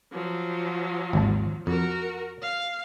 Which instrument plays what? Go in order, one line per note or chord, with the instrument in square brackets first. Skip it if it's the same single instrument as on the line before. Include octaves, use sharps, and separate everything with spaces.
[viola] F3 F#3
[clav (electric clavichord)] G#1 D#2 A5
[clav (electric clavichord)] F2 [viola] F#4 A#4
[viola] F5